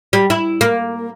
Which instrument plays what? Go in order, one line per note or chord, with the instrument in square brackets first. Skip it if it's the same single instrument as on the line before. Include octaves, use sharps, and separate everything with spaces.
[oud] G3
E4
A#3